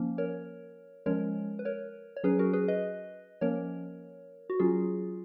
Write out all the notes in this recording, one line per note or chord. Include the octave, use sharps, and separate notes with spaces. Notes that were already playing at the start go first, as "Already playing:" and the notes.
Already playing: F3 A#3 C#4
A#4 C#5
F3 G#3 C#4 A#4 C#5
B4
A#4 C#5
C#5
F#3 C#4 G#4 B4
F#4 A#4
G#4 B4
B4 D#5
F3 A#3 C#4 A#4 C#5
F#4
F#3 C#4 F4 G#4